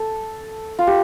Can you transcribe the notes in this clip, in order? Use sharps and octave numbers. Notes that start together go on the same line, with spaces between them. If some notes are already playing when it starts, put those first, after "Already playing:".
Already playing: A4
F4
G4